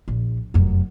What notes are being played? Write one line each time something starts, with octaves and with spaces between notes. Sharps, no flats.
A#1
F1 F#2